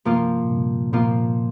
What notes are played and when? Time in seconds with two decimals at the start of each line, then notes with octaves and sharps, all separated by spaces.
0.05 G2 C3 F3 A#3 F4
0.42 A#2
0.49 G2 C3
0.93 A#2 F3 A#3 F4